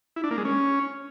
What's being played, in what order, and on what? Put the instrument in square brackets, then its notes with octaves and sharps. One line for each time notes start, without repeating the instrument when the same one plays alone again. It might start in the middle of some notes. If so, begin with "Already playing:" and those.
[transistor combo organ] E4
D4
A#3
G#3
C#4